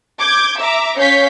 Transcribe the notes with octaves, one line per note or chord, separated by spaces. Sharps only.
D6 G6 G#6
E5 A#5 D6
C#4 C#5 F5 G6 B6